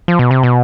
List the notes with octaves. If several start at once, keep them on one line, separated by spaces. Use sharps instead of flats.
F3
B2
C3
B2